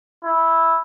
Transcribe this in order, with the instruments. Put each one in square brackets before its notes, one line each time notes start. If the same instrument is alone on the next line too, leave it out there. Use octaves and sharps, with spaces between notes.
[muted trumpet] E4